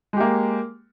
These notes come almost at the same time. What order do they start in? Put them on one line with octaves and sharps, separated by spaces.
G#3 G4 A#3